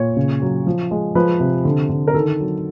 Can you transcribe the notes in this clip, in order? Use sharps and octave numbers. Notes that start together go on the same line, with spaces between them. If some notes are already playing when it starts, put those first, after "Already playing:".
Already playing: A#2 C#5
C#3
F#3
F3
G#3
F3 B4
C3
D3
D3
A#4
D#3 A4
F#3